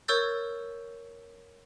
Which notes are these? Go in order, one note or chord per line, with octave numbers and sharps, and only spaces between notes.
A#4 C#5 C#6 E6 G6 A6